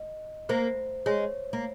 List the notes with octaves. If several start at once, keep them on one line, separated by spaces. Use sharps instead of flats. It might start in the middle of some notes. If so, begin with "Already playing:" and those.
Already playing: D#5
A#3 C5
G#3 C#5
A#3